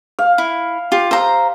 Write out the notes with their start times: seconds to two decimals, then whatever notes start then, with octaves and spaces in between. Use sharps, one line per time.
0.19 F5
0.38 E4
0.92 F4 G4
1.11 C5 F5 A#5 E6